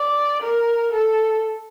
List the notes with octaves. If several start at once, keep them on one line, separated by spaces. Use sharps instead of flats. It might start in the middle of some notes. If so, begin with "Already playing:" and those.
Already playing: D5
A#4
A4